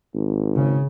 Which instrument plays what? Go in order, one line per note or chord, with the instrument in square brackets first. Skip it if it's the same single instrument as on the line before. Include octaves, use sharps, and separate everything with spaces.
[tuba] G#1
[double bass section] C#3